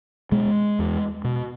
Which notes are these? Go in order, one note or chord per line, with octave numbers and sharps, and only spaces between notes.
B2 G#3
E2
B2